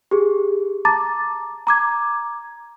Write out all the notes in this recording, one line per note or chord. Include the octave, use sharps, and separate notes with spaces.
G4 G#4
A5 A#5 D6 A6
A#5 D6 G#6